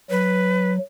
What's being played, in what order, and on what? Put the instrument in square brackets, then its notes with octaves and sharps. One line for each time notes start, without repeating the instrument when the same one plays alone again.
[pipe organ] F#3 [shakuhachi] B4